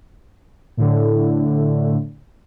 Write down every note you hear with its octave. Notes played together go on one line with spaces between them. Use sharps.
A2 D3